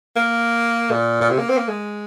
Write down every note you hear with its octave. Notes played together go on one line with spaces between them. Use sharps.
A#3
A#2
A#2
C3
A#3
C4
A#3
G#3